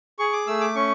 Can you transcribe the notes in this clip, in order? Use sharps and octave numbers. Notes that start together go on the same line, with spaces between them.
G#4 C#6
D6
A3 E6
D6
C#4 C#6